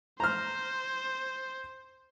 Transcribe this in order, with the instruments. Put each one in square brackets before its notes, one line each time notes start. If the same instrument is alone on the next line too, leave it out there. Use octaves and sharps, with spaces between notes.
[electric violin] C5 [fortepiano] A#5 F6